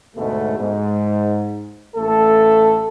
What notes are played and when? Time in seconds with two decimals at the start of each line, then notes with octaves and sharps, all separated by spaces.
0.16 D2 G#2 B2 G#3 A3
0.57 G#2
1.96 A1 A3 A4